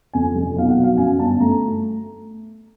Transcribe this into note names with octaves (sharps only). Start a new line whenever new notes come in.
F2 G#5
F1
B1 F5
F#5
F#3
F5
F#2 G#5
G1 A5
A3 A#5